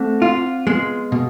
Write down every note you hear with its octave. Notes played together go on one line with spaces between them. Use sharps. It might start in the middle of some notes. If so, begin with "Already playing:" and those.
Already playing: A3 C4
F4
G#3 B3
B2